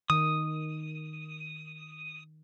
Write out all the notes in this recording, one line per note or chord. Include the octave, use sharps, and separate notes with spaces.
D#3 D#6